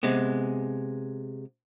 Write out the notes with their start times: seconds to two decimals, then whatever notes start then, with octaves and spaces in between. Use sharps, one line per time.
0.03 C3 G#3 B3